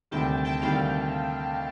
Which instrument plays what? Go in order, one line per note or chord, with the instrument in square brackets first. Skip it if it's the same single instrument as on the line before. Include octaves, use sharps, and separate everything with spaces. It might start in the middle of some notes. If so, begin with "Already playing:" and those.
[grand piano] D2 C3 D#3 G3 [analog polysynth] G5 A5
[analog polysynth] G5 A5
[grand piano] D2 C3 D#3 G3 [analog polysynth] F5 G5